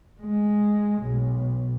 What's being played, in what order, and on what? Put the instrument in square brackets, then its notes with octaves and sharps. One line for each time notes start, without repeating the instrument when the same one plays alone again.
[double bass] G#3
B1